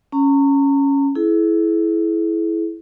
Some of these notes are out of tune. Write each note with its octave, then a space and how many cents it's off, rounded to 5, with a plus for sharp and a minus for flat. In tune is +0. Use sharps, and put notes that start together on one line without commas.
C#4 +0 A#5 -35
E4 +0 G#4 +40